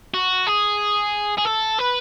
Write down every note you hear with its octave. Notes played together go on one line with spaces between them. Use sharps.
F#4
G#4
G#4
A4
B4